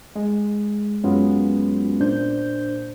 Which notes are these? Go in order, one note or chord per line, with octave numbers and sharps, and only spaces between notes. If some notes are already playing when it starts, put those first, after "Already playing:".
G#3
F#2 F#3 G#3 B3 C#4 F4
A#2 D4 C5 G6